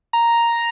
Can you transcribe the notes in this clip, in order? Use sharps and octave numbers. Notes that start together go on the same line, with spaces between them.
A#5